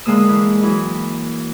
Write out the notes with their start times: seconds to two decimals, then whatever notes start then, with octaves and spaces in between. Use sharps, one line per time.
0.05 D3 G#3 A#3 D#6 E6
0.28 E3
0.62 E3 F#3